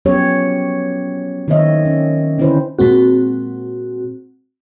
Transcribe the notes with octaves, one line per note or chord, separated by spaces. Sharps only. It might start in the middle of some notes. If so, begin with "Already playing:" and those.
F3 F#3 B3 C#4 G4 C#5
D#3 A#3 C4 C#5 D#5 E5
C#4
D3 C4 C#4 E4 B4 C5
A#2 G#3 C4 F#4